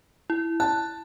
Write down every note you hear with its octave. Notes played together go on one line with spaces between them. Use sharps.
E4
A5 F#6